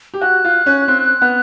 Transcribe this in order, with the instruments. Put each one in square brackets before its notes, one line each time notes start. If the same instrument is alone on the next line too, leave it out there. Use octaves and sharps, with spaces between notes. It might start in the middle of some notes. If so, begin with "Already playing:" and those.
[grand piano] G4
[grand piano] F#4 [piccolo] F#6
[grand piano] F4
C#4
C4
B3